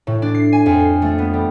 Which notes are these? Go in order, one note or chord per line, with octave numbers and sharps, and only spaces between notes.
A2
D4
C7
G#5
F2
C7
A3
B3
G3